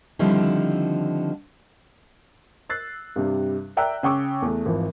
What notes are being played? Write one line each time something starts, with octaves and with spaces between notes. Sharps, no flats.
D3 D#3 F3 G3 C4 E4
E6 F#6 A6 C7
G2 C3 G3
D5 E5 G5 A#5 E6 F#6
C#3 G5 C#6 D6 E6
E2 A3
G#1 E3 F3